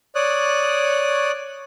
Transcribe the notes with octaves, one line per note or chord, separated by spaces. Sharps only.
C#5 D5 D#6 F#6